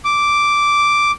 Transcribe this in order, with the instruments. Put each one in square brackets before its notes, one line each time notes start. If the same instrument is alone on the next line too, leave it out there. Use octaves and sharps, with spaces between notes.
[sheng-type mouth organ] D6